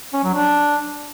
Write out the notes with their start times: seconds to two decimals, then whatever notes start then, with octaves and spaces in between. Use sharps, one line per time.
0.13 C#4
0.24 F#3
0.34 D4